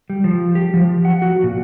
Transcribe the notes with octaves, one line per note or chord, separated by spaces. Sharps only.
G3
F3
G4
F3
F#5
F#4
A#2